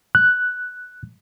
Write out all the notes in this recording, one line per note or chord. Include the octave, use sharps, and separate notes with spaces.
F#6